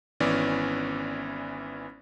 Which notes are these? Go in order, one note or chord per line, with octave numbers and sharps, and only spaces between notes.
G#1 E3 B3 C#4 D5